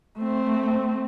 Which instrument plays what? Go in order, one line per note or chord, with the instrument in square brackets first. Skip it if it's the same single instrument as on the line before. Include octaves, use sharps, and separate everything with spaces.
[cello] A3 C4